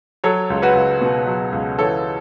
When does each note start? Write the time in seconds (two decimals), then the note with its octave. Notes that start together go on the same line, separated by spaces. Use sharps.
0.24 F#3 A4 C#5
0.50 C#2
0.62 F#4 B4
0.75 C#2
1.01 B2
1.27 F#3
1.52 C#2
1.78 E3 A4 C#5